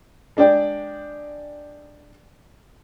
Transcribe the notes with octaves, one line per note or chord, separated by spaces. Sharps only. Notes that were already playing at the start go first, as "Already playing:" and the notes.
G#3 D4 D5 G5